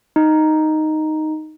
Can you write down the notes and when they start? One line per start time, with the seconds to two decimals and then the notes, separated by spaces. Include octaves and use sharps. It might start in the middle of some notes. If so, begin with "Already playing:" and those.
0.16 D#4